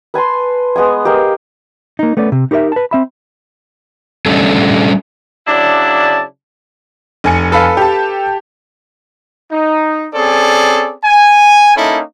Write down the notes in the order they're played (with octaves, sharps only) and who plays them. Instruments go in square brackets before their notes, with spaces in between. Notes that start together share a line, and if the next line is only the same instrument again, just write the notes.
[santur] B4 G#5 A5 C6
G#3 B3 D#5 G#5
G4 A#4 D#5 F5
[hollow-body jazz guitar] A#3 D#4
A3 B3 C#4 D5
C3
D#4 G4 A#4 C5 E5
B4 A5
C4 E5 B5
[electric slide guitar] G3 A3 C#4 D4 A4
[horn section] C#3 F#3 D4 E4 D5 A5
[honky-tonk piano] F1 G#5 C#7
[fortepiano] A4 B4 F5
[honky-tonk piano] G4 A5
[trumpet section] D#4
C4 C#4 G#4 A4 D5
G#5
A#3 C#4 D#4 E4 A4